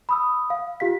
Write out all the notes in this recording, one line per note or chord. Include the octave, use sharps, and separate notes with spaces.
B5 D#6 E6
F5
F4 G4 F5 B6